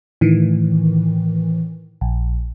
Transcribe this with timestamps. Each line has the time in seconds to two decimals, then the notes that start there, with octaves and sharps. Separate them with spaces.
0.21 A2 D#3 E3
2.01 A#1